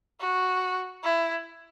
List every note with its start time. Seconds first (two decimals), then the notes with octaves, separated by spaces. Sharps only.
0.20 F#4
1.03 E4